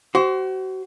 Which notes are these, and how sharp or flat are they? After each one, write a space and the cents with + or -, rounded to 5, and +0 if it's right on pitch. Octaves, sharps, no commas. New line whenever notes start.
F#4 +35 C5 +0